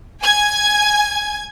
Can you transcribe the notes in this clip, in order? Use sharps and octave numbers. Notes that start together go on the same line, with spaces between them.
G#5 G#6